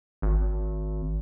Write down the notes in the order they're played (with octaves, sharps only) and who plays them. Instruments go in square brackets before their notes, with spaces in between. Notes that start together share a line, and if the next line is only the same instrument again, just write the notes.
[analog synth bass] G#1